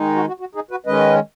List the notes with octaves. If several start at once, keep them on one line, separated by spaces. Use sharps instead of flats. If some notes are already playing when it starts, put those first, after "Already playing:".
Already playing: D#3 G#3 D#4
F#4
F#4
F#4
D#4 G#4
F#4 B4
D#3 G#3 C#4 B4 D#5